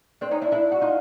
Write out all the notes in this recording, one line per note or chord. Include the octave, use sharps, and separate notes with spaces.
C4 D4
C#4 D#4
D4 E4
D4 E4
F#4
D#4 F4